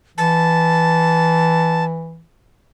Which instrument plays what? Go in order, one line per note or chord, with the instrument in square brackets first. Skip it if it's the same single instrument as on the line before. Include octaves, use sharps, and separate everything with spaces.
[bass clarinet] E3 [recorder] A5